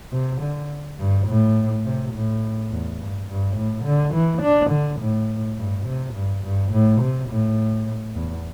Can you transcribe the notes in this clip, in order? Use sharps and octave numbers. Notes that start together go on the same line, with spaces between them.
C3
D3
G2
A2
C3
A2
E2
G2
G2
A2
D3
E3
D4
D3
A2
G2
C3
G2
G2
A2
C3
A2
E2